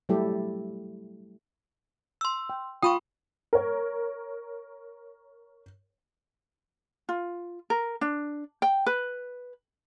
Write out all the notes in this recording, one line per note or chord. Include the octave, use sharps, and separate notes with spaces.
F#3 G3 A3 E4 G4 A4
C6 E6
G5
F4 G5 B5 C#6 D#6
A#4 C#5
F4
A#4
D4
G5
B4